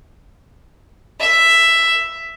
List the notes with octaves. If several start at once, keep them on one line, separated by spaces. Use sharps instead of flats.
E5